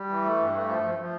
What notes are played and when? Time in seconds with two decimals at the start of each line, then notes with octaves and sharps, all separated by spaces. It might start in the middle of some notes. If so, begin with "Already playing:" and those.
Already playing: G3
0.09 E3
0.24 A3
0.39 G2
0.54 A3
0.68 F3
0.83 F3
0.98 F3